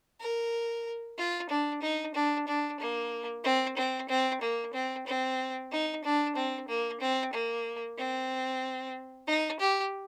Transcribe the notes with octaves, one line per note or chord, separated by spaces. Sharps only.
A#4
F4
D4
D#4
D4
D4
A#3
C4
C4
C4
A#3
C4
C4
D#4
D4
C4
A#3
C4
A#3
C4
D#4
G4